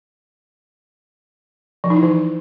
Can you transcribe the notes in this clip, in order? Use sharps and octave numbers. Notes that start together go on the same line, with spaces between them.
F3
D#4
E4
E3